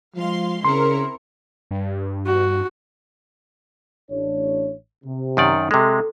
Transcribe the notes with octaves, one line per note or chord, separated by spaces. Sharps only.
F3 G#3 F5 C6
C#3 C4 E4 A#4 C6 C#7
G2
F#4
A1 D4 C#5
C3
F#2 D#3 D5
C3 G#3 A4